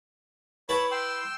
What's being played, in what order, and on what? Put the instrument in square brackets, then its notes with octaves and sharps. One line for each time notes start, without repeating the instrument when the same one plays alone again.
[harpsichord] E4 B4 A5 [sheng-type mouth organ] C#5 B5
[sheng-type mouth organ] G5 C6 E6